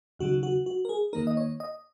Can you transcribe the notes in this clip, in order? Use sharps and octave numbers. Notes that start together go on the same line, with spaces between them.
D#2 C#3 F#3 D#4 F#4
F#4
F#4
A#4
G#4
D#2 D#3 A#3 D#4 A#4
D#5
C#5
D#5